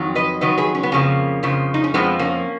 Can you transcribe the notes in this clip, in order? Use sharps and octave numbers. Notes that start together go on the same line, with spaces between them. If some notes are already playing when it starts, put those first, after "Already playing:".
Already playing: F2 D#3 F#3
B4 D#5
F2 D#3 F#3 B4 D#5
G#4 B4
C#4
B3
F2 C#3 F3 A#3 C#4
F2 C#3 F3
D#4
C#4
F2 F3 G#3 B3
A#3 C#4